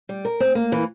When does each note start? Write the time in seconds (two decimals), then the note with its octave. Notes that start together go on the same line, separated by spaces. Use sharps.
0.09 G3
0.25 A#4
0.40 C4
0.55 A#3
0.72 E3